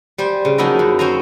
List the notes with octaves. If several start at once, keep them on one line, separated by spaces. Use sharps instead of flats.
G3 C5 G#5
C#3
F3 F#3 A#3 D#4 E4 D#5
F#2
C4 C#4 C5 G#5 A#5